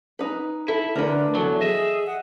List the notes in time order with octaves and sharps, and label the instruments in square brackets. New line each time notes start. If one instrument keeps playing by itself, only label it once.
[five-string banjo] D#4 B4
[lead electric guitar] E4 [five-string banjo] A4
[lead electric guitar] D2 D3 [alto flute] D4 [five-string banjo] A#4 B4
[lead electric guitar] E2 F#3 [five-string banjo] A4
[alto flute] G#4 [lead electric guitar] D#5 E5
[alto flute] F#5